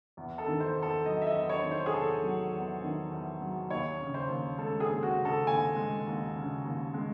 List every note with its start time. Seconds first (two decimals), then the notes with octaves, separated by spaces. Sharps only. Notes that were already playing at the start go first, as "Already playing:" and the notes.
0.17 E2
0.38 A4
0.47 D#3
0.60 C5
0.76 E2
0.82 A4
1.05 F#3 D#5
1.22 E5
1.27 D#5
1.34 E2
1.49 C#5
1.64 D#3
1.71 C5
1.86 G#4
1.93 E2 A4
2.23 F#3
2.53 E2
2.82 D#3
3.11 E2
3.41 F#3
3.70 D#2 C#5
4.00 C#3
4.14 C5
4.29 D#2
4.58 G#3 A4
4.80 G#4
4.88 D#2
5.03 F#4
5.17 C#3
5.25 A4
5.47 D#2 G#5
5.76 G#3
6.06 D#2
6.36 C#3
6.65 D#2
6.94 G#3